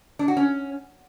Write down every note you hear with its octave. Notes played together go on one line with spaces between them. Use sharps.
D4
F#4
C#4